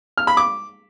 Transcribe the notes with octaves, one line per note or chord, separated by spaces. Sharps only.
F6
B5
D6